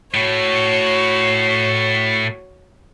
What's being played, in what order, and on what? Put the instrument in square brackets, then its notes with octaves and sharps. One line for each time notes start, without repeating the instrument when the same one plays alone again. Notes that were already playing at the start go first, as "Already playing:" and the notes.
[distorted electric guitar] A2 [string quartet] F#4 C#5